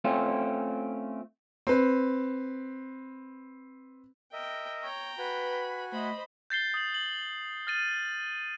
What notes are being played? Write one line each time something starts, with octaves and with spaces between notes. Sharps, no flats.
A3 C4 C#4 F4
C4 B4
A#4 D#5 E5 G5
C#5 G5 A#5
F#4 B4 G#5 B5
A3 C5 D#5 B5
G6 A6 C7 G7
D#6 F#7
F#7
F6 A6 D#7